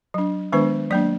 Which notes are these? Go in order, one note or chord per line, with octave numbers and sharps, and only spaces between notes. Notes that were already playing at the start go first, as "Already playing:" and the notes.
F#3 D4
D#3 G#3 B3 D4 B4
F#3 A#3 D4 D5